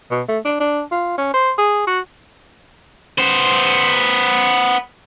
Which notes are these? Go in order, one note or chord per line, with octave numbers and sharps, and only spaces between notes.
B2
A3
D4
D4
F4
C#4
C5
G#4
F#4
B3 C5